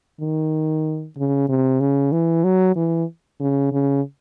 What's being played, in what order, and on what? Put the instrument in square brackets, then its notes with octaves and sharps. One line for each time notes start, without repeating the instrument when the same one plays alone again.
[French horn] D#3
C#3
C3
C#3
E3
F#3
E3
C#3
C#3